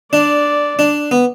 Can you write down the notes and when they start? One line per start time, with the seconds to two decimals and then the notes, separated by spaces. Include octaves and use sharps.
0.13 D4 D5
0.79 D4
1.11 B3